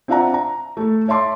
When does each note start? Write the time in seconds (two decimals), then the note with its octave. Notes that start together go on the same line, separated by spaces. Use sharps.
0.08 C4 D4 F4 E5 F#5 A#5
0.34 A#5
0.77 A3 A4
1.08 C#5 E5 A5 C6 D6